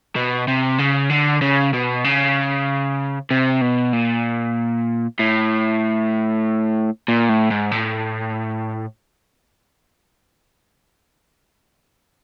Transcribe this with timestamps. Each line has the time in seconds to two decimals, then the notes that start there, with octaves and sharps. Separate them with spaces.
0.16 B2
0.48 C3
0.78 C#3
1.10 D3
1.42 C#3
1.73 B2
2.04 C#3
3.31 C3
3.61 B2
3.93 A#2
5.19 A2
7.08 A#2
7.29 A2
7.50 G#2
7.71 A2